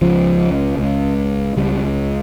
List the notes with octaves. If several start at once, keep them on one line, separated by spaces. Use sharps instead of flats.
C#2 C#3 F3
C#2 C#3
C#2 C#3 G3